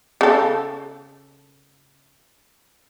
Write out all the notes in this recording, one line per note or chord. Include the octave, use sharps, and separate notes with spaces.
C#3 A4